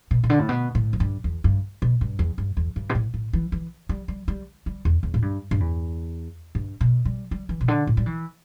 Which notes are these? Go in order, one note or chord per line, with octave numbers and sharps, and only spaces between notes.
B2
B2
D3
A2
B2
A2
E2
G2
E2
G2
B2
G2
E2
G2
E2
G2
B2
A2
A2
E3
E3
G3
G3
G3
G3
E2
E2
A2
G2
G2
E2
G2
B2
G3
G3
E3
B2
D3
A2
G3
E3